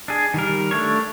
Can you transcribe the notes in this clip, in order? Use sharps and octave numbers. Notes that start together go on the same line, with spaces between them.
D4 G#4
D#3 G3 A#4
A3 D4 C#5